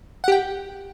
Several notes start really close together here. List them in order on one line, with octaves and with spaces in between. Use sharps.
F#5 G4 G5